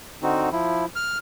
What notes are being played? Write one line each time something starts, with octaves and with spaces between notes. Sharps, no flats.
D3 C4 D#4 F#4
F3 E4
F6